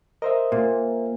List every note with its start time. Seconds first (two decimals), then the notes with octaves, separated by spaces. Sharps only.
0.22 A#4 C5 D#5 E5
0.52 A#2 A#3